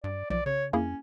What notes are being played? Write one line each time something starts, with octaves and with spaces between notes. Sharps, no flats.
G2 D5
B1 F3 D5
C#3 C#5
F2 A#3 C#4 E4 G#4